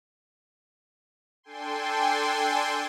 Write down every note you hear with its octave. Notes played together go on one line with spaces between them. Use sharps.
D4 A4 G5 G#5 C6